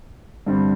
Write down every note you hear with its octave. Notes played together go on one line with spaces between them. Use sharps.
G2 D3 G3 C4